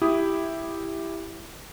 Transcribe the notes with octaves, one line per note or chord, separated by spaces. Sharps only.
E4 G4 D#6